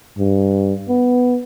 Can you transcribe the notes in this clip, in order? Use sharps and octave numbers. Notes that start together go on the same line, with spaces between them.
G2
B3